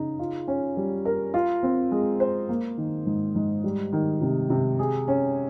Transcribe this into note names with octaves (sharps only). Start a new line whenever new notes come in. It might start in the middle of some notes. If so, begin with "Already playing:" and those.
Already playing: C#3 D#4
F4
C#4
G3
A#4
F4
C4
G#3
C5
A#3
D#3
G#2
G#2
G3
D#3
C3
C3
G#4
C#4